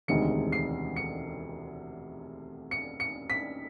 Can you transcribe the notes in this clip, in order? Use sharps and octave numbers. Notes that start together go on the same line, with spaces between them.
E1 D2 C3 D#3 G#3 C#7
C7
C#7
C#7
C#7
B6